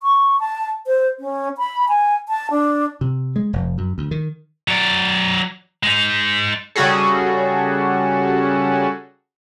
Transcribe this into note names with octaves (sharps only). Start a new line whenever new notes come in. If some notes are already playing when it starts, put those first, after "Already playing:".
C#6
A5
C5
C#4
B5
G#5
A5
D4
C3
G#3
F1
F#2
D2
D#3
F#3 D5
G#3 D#4
C#3 G3 C#4 F#4 G#4 A4